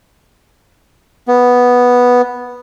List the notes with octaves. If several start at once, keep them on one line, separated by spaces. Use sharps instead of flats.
B3